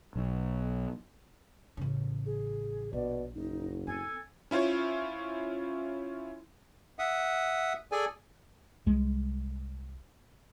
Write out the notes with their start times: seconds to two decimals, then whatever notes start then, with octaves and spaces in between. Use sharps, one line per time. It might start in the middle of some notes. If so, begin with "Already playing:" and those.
0.16 B1
1.77 A1 C#3
2.26 G#4
2.93 A#1 B2 D5
3.34 F#1 D#4
3.87 C4 D#4 A4 G#5
4.51 C#4 E4 F4 C5 C#5
6.99 E5 F#5 D#6
7.92 G#4 A4 D5 G#5
8.86 C2 G#3